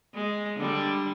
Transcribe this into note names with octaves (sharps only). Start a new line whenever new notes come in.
G#3
D3 G3